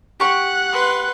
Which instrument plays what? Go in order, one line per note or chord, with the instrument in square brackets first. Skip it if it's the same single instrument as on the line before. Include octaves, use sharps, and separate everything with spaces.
[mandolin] G4 C#6 [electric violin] F#5 F#6
[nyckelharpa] B4 C6